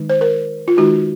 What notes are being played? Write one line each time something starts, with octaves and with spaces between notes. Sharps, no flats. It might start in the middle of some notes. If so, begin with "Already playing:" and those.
Already playing: D#3 G#3 D#4
C5
A#4
F4
D#3 G#3 D#4 F#4